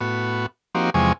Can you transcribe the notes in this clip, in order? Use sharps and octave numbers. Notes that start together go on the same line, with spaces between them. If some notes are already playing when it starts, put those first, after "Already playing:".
A2 B3 F#4
F3 A#3 C4 D#4 F#4 G4
E2 C3 F3 G#3 G#5 C#6